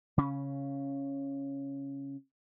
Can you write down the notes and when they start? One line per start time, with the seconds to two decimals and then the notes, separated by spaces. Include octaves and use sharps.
0.18 C#3 C#4